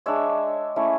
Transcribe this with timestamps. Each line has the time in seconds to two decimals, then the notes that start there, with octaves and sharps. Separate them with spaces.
0.06 G#3 D4 C#5 E5
0.76 A3 C#4 E4